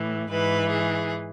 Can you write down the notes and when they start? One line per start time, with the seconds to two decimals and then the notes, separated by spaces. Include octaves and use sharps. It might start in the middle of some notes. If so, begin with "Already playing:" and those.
Already playing: A2 E3
0.29 G#2 E3 B4
0.71 G#4